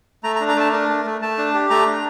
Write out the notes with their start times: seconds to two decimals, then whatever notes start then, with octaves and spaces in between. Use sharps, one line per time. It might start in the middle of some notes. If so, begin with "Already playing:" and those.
0.23 A3 A#5
0.36 A#5
0.41 D4
0.48 A#5
0.56 A3 A5
0.72 D4 A#4
0.89 A3
1.06 A3
1.22 A3 A5
1.38 D4
1.54 G4
1.70 A3 A#5
1.86 D4